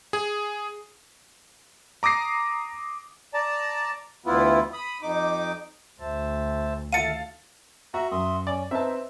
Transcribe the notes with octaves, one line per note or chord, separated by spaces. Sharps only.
G#4
A#5 D6 D#6 A#6 C7
D5 A5 A#5
D2 E3 B3 E4 F4
B5 D#6
F2 D#4 D6
D2 C5 E5 A5
D#3 A4 E5 F5 A5 A6 C#7 D#7
F#4 E5 A#5
F#2 E5 C6 D#6
C#4 D5
C4 D#4 B4 E5 A5